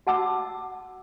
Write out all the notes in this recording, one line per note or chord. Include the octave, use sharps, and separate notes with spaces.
F#4 F#5 A5 D6 E6